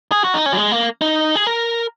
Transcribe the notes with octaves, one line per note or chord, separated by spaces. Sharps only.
G#4
F#4
D#4
C#4
F#3
G#3
A#3
D#4
G#4
A#4